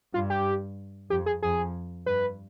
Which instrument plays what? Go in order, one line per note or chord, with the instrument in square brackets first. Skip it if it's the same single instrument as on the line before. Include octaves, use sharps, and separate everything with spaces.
[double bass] G2 [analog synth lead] F4
[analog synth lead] G4
[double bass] F2 [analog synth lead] G4
[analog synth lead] G#4
[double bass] F2 [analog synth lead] G#4
[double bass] G2 [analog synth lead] B4